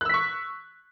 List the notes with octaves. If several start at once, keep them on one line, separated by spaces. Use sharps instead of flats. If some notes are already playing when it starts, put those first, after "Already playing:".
C#6 E6 F#6 B6